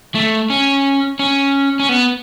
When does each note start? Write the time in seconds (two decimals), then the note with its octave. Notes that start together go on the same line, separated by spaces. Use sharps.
0.15 A3
0.50 C#4
1.19 C#4
1.80 C#4
1.89 B3